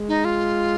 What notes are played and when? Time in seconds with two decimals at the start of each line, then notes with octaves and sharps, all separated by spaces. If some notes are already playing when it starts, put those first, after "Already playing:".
Already playing: G#3
0.08 D#4
0.25 F4